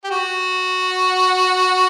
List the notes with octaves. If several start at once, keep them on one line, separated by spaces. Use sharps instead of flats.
G4
F#4